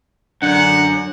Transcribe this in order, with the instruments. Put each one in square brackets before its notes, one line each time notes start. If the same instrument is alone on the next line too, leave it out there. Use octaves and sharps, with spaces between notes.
[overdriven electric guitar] F#2 [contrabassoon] D3 [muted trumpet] F#5